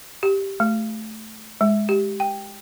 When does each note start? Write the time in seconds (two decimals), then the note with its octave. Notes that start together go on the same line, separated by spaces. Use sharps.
0.23 G4
0.60 A3
1.61 G#3
1.89 G4
2.20 G5